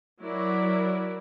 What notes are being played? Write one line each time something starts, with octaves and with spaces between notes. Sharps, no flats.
F#3 E4 A#4 D5